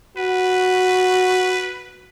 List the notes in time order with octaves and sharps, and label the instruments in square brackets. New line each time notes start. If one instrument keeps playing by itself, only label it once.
[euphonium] F#4 [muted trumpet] B4